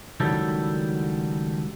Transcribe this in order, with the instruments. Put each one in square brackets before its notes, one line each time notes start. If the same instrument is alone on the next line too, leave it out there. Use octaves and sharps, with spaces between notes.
[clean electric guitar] C#2 D#3 F#3 G3 E4 A4